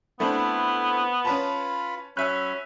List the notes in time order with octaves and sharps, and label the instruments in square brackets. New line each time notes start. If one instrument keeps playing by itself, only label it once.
[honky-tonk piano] A3 C4 D4 [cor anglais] B3 [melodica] E4
[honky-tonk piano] C#4 B4 A5 [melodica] F4 B5
[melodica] F#3 B5 [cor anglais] C#4 [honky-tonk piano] E5 F#6